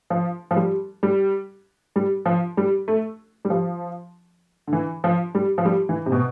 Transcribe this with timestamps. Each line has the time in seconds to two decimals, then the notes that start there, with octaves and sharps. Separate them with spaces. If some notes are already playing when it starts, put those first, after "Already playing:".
0.10 F3
0.51 F3
0.56 G3
1.03 G3
1.96 G3
2.26 F3
2.57 G3
2.88 A3
3.45 G3
3.50 F3
4.67 D3
4.73 E3
5.04 F3
5.35 G3
5.58 F3
5.65 G3
5.89 E3
6.06 C3
6.12 B2